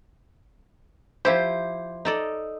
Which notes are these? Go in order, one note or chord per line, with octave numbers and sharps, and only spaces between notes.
F3 E4 G4 C5
D#4 A4 D5